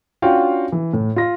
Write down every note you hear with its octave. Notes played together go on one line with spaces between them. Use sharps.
C#4 D4 F4 F#4 F5 G5
E3
A2
F4 A#6